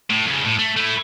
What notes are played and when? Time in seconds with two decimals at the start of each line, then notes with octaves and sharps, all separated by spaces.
0.10 A2
0.26 F2 C#3
0.45 A2
0.59 A3
0.77 A3 E4